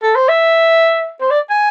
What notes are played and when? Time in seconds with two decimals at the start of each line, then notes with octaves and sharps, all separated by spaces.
0.03 A4
0.15 C5
0.28 E5
1.21 C5
1.30 D5
1.50 G#5